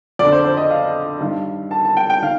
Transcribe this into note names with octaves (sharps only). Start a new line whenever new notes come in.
F2 D3 D5
C5
C5
D#5
F5
G2 D#3
A5
A5
G5
G5
D#3 F5